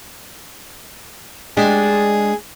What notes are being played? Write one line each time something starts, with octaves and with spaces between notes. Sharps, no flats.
G#3 D4 G4 G#4